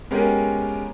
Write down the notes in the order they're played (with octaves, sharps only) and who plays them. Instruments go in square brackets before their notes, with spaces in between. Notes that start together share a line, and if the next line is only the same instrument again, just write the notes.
[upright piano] G#3 B3 C#4 G4 G#4 A#4